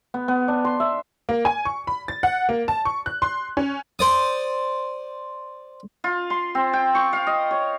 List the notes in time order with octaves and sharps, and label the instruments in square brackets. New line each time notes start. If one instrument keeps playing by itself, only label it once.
[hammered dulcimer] B3
B3
D4
C6
E5
[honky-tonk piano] A#3
G#5
C#6
B5
A6
F#5
A#3
A5
C#6
F#6
C6
C#4
[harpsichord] C5 D5 D#6
[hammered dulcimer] F4
C6
C4
G5
C#6
F5
D#5
C#5